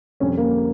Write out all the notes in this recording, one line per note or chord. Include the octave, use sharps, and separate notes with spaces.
F2 D3 G3 C#4
A#3